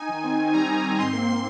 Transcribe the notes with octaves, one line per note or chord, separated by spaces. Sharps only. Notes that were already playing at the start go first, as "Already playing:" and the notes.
Already playing: D#4 G#5
D#3
C4
D#3
G3 A#5
D#3
C4
G#2 C6
A#3 C6
C6